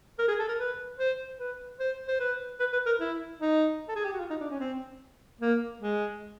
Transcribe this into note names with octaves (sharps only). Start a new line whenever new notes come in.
A#4
G#4
A4
A#4
B4
C5
B4
C5
C5
B4
B4
B4
A#4
E4
D#4
A4
G#4
G4
F#4
F4
D#4
D4
C#4
C4
A#3
G#3